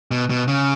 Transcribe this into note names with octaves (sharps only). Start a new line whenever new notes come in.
B2
B2
C#3